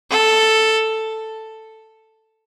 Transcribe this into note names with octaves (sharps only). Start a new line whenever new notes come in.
A4